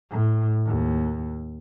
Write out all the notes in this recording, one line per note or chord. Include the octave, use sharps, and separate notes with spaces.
A2
D#2